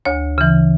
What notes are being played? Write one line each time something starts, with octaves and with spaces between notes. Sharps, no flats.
D2 C#5
C#3 E3